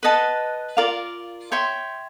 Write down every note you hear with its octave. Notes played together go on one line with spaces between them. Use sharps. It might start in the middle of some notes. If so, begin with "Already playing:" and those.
B4 D#5 F#5 A5
F4 A#4 D5 F5
C#5 E5 G5 C6